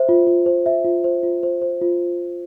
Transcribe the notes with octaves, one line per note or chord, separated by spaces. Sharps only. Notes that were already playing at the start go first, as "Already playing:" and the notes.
Already playing: C5 E5
F4
F4
C5
E5
F4
C5
F4
C5
C5
F4